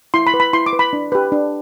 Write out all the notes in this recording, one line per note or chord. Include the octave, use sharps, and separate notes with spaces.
E4 C6
B5
B4
B5
E4 C6
D6
B4
B5
D4
G4 B4
D4